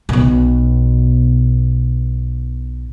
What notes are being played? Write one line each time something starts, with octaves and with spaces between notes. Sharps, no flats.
B1 B2